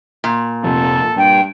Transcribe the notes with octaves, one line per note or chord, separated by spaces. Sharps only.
A#2
F1 C3 F3 A4
G2 G5